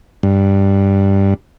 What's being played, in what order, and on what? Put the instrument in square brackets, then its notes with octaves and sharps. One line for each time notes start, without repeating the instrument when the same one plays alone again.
[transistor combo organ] G2